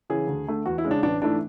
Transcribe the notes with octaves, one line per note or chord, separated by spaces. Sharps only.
C#3 E3 G#4
D2
D3 A3
E2 F#4
E4
C#3 G#3
D4
A1 D4
G#2 E3 A3 D4